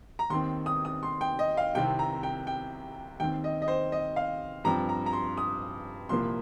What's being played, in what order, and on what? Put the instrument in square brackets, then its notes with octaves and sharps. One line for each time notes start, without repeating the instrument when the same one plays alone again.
[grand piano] A#5
D#2 D#3 C4 C6
D#6
D#6
C6
G5
D#5
F5
C2 C3 D#3 C4 G5
A#5
G5
G5
D#2 D#3 C4 G5
D#5
D#5
C5
D#5
F5
G2 F3 C4 A#5
A#5
A#5
C6
D#6
C2 A#2 F3 A#3 C6